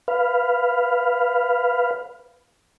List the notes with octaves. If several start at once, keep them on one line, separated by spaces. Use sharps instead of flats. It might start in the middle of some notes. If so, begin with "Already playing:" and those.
B4 F5